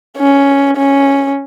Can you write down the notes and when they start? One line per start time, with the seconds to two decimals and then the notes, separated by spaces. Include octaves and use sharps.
0.18 C#4
0.77 C#4